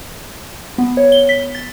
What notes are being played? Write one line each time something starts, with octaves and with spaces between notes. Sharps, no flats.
B3
C#5
G7
B6
A6